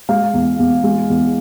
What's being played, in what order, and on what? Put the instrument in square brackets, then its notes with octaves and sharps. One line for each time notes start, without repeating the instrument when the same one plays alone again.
[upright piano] G#3 F5
E2
E2
G#3
E2